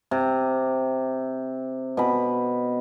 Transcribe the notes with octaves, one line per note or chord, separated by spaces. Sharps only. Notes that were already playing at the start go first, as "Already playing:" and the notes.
C3
B2 B5